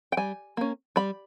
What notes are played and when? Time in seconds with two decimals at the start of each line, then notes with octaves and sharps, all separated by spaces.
0.12 G5
0.17 G3 G#5
0.57 A#3 C#4
0.96 G3 B5